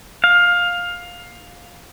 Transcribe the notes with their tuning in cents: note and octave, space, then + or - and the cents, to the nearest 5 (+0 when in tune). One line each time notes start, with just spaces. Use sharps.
F5 +15